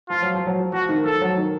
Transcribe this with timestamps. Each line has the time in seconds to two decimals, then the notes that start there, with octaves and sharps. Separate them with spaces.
0.09 F3 F4
0.22 F#3
0.35 F3
0.47 F#3
0.60 F3
0.73 F3 F#4
0.89 D#3
1.05 F3 A4
1.21 F#3
1.37 D#3